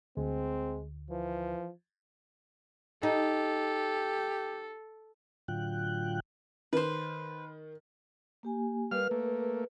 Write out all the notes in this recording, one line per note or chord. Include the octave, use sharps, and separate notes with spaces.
D2 G#3 C4
E3 F3
D#4 G4 A4
A2 D3 F#3 F4 G5 F#6
D#3 B4 C5
A#3 G4 G#5
G3 A#4 B4 F5 F6
A3 A#3